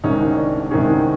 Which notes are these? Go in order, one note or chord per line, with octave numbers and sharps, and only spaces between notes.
C2 C3 D#3 G#3 C#4 D#4
D4
C2 C3 D#3 G#3 C#4 D#4